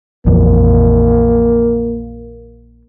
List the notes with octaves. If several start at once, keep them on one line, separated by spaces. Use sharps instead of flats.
A#1 F2 E3 A#3